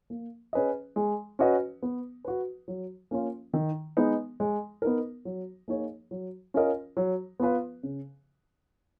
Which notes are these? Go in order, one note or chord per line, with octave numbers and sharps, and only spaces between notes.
A#3
C#4 G#4 B4 D#5
G#3
C#4 F#4 B4 D#5
B3
F#4 B4
F#3
A#3 C#4 F4
D#3
G#3 B3 D#4
G#3
B3 D#4 A#4
F#3
A#3 D#4 G#4 C#5
F#3
C#4 F4 A#4 D#5
F#3
B3 F4 B4
C#3